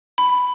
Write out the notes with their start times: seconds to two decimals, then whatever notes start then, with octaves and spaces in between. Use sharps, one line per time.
0.18 B5